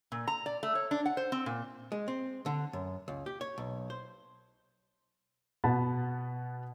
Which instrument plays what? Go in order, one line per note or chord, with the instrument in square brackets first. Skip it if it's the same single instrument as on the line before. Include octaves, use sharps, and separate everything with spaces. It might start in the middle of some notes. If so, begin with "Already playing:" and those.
[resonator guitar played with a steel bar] A#2
A#5
D5
A3
C#5
D4
F#5
C5
C4
A#2
[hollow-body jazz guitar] G#3
C4
D3
F#2
C#2
G4
C#5
B1
C5
[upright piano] B2 B3 A5 B5 A6